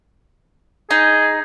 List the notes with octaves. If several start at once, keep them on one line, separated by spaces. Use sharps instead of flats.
D#4 G#4